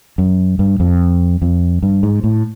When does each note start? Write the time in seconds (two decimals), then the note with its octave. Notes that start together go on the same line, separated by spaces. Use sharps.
0.18 F#2
0.59 G2
0.80 F2
1.42 F2
1.83 G2
2.03 G#2
2.24 A2